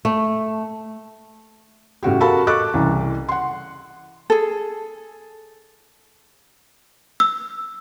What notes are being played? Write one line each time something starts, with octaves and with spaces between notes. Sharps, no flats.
A3
A2 C#3 F#4 G4
F#4 A4 A#4 F5 A5 B5
A4 D#5 C#6 D6 F#6
C2 C#3 E3
F#5 C6
G#4 A4
E6